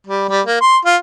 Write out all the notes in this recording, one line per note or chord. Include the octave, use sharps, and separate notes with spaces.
G3
G3
A#3
C6
F4